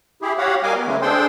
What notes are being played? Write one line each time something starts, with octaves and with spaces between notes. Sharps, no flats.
E4 G4 G#4
F#4 G4 C#5 F5 F#5
G3 A#4 D#5 F5 G#5 D6
B3
C#3 E3 F#3 G#3 A3
D4 G#4 A4 C5 G5 C6